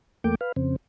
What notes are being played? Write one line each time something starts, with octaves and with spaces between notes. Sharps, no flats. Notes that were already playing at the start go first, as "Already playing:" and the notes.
E2 A3 A#3 G5 D6
B4 F5
F2 C#3 C4